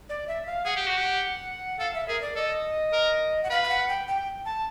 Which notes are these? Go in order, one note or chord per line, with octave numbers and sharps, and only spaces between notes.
D5
E5
F5
G#4 F#5
G4
F#4
G4
A4 F5
E5
G#4 A#4
D5
A4 D#5
A#4
F#5
B4 F5
F5
F#5
G5
G5
A5